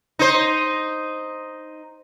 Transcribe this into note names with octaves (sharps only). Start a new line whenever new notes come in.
D#4 C5